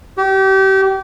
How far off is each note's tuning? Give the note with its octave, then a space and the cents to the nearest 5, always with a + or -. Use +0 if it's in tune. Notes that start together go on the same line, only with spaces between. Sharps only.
G4 -30